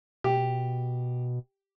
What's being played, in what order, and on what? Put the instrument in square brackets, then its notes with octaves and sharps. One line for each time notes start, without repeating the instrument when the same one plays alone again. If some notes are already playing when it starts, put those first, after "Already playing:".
[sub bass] B2 [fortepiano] G4